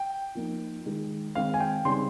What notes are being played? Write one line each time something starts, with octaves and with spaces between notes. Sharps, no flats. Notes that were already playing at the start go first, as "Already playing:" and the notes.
Already playing: G5
F3 A#3 D#4
D#3 G#3 D#4
D#3 G#3 C4 D#4 F5
G#5
G5
C#3 G3 C4 D#4 C6